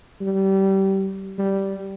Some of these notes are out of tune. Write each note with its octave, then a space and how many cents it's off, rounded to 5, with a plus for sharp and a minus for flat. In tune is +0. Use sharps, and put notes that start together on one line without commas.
G3 -25
G3 -10